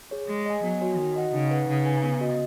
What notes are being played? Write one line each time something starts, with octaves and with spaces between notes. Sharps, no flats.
G#4 C#5
G#3 G#4
D#5 G#5
F#3 B3
F#4 C#5 G#5
D#3 F#4
D#5 F#5
C#3 D#4
B4 F#5
C#3 D#4
B4 G#5
B3
F#4 D#5